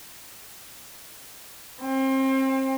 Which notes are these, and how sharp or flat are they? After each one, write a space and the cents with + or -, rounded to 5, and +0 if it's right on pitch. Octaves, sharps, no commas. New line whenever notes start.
C4 +30